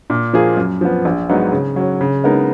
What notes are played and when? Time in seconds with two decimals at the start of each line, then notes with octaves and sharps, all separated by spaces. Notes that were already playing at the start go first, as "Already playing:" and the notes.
0.10 A#2
0.33 F3 A#3 F4 G#4
0.57 F#2
0.81 F3 B3
1.05 A#1
1.29 G#2 F#3 B3 D#4
1.52 C#3
1.76 F#3 C#4
2.01 C#3
2.24 G#3 B3 D#4 A#4